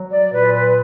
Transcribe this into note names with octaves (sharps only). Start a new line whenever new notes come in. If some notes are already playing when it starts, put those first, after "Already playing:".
Already playing: F#3
D5
A#2 B4
B4